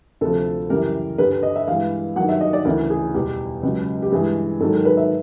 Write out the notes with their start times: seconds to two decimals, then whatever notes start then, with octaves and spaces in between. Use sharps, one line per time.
0.21 D2 C3 F3 A4
0.70 F#2 C#3 E3 G3 A#4
1.18 G2 D3 G3 B4
1.43 D#5
1.56 E5
1.68 G2 E3 G#3 F5
2.16 G2 D#3 F#3 F#5
2.29 E5
2.41 D#5
2.53 D5
2.65 D2 C#3 E3 A#4
2.90 G#4
3.14 E2 B2 G3 G4
3.63 C#2 C#3 F#3
4.02 G4
4.12 G2 E3 G#3 G#4
4.60 G#2 D#3 F#3 A4
4.73 A#4
4.85 B4
4.97 E5